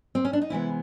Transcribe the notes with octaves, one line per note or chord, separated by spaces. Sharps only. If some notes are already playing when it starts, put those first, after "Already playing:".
C4
C#4
D4
D#4
C3 E3 G#3 B3 E4